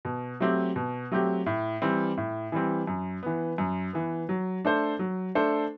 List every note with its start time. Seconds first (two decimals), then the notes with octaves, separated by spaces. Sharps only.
0.05 B2
0.40 F#3 A3 C4 G4
0.76 B2
1.12 F#3 A3 C4 G4
1.46 A2
1.82 E3 G3 C4
2.17 A2
2.52 E3 G3 C4
2.87 F#2
3.23 E3 B3
3.58 F#2
3.93 E3 B3
4.29 F#3
4.65 A3 D4 A4 C5
4.99 F#3
5.35 A3 D4 A4 C5